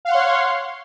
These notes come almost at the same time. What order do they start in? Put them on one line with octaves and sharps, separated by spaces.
F5 F#5 C6 C#5